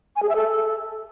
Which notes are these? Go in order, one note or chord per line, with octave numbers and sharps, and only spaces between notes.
G#5
G#4
E5
A4